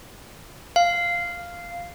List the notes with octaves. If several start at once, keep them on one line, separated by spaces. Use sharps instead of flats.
F5